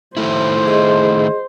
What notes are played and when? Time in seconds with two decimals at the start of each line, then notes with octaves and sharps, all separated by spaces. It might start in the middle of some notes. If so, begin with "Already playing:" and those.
0.17 D#3 A3 E4 C5
0.65 G#4 D#5